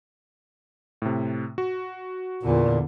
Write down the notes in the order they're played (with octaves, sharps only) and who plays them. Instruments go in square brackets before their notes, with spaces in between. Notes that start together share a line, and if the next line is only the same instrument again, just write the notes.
[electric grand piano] A2 C3
F#4
[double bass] E2 D3 [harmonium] A#2